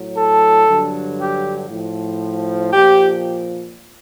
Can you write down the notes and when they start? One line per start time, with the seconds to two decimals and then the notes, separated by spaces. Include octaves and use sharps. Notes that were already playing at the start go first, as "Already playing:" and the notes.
Already playing: A2 F#3
0.16 A4
0.67 G2 D3 F#3
1.18 G4
1.69 A2 F3
2.73 A#2 F3 G4